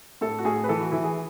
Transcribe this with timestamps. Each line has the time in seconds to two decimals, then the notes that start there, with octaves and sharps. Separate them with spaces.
0.21 A2 A4
0.39 F#4
0.45 A2 G#4
0.64 B4
0.69 E3 A4
0.81 F#4
0.91 E3 E4
1.04 G#4